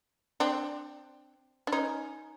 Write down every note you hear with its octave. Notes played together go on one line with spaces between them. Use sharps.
C4 D4
D4
C#4 D#4